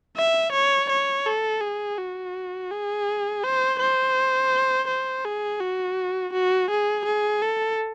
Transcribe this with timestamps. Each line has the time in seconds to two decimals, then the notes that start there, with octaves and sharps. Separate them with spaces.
0.17 E5
0.53 C#5
0.89 C#5
1.26 A4
1.61 G#4
1.98 F#4
2.71 G#4
3.44 C5
3.79 C5
4.88 C5
5.25 G#4
5.60 F#4
6.33 F#4
6.70 G#4
7.06 G#4
7.42 A4